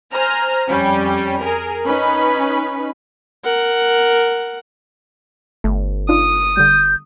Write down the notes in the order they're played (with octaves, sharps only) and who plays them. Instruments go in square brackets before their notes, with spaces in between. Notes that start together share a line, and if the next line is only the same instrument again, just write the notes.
[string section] C5 G#5 A#5 F6
F2 G3 C#4
G#4 A#4
C#4 D#4 B4 B5
[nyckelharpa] A#4 F#5
[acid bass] G1 [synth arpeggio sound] A3
[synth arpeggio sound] D4 D#4 F4 [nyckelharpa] D#6
[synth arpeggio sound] D3 G3 [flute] G6